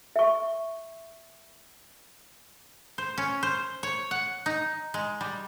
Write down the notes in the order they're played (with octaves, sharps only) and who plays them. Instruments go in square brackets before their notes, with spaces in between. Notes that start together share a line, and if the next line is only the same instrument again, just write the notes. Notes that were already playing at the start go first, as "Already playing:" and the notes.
[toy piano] E5 C#6
[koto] C5
C#4
C5
C#5
F#5
D#4
G#3
G3